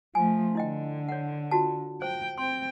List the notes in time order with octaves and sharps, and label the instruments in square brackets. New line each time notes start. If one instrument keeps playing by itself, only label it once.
[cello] F3 A3 [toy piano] G#5
[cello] D3 [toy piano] E4 D#5 G5
[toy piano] C#5 F#5
F4 F#4 A5
[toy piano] C5 [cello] G5
[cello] C4 G5 [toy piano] C6